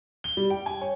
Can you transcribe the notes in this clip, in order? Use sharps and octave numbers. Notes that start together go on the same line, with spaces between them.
G7
G3
G5
G#5
C#5